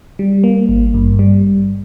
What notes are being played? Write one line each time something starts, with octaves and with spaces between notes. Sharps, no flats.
G3
A#3
G#1
G2
G3